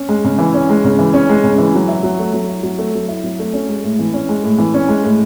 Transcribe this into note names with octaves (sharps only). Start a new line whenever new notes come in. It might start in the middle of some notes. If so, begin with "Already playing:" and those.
Already playing: C#4
G#3
C#3
E3
C#4
G#3
C#3
E3
C#4
G#3
C#3
E3
F#3
E4
F#3
A3
F#3
E4
F#3
A3
F#3
E4
F#3
A3
C#4
G#3
A2
E3
C#4
G#3
A2
E3
C#4
G#3
A2